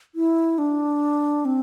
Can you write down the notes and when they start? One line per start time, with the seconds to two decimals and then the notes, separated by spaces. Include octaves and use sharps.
0.15 E4
0.58 D4
1.45 C4